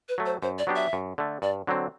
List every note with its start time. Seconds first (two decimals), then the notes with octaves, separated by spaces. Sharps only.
0.09 B4
0.18 F#3 A3
0.26 C5
0.43 F#2 C5
0.59 D5
0.67 F#3 B3 D4 G4
0.76 E5
0.93 F#2
1.18 D3 A3
1.42 G2 D5
1.67 D3 F#3 C4